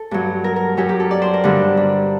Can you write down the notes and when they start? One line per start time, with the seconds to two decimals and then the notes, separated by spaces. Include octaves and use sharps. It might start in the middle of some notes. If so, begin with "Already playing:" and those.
Already playing: A4
0.11 G2 F#3
0.44 A#4
0.56 A#4
0.77 F#2 F#3 G4
0.89 G4
1.00 A4
1.11 D5
1.22 C5
1.34 A#4
1.44 G2 D3 G3
1.77 D4